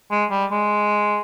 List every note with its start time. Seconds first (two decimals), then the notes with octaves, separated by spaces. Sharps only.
0.11 G#3
0.31 G3
0.51 G#3